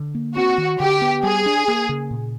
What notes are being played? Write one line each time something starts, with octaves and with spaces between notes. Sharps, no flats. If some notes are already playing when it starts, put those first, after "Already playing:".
Already playing: D3
A#3
C4 F#4
D#3
D3 G4
B3
G3 G#4
D4
A#3
C#3
A#2